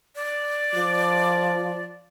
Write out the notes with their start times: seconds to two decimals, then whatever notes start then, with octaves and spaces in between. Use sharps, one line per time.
0.15 D5
0.74 F3